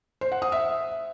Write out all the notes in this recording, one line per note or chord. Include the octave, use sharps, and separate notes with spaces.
C5
F#5
D#6
E5